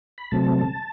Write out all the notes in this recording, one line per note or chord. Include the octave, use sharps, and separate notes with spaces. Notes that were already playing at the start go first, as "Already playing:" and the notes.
B5
C3 F#3 A3 C4 A5